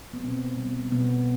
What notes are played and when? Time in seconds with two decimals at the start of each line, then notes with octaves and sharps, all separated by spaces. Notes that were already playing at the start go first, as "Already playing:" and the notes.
0.13 B3
0.23 B2 C4
0.57 G3 B3
0.92 B2 B3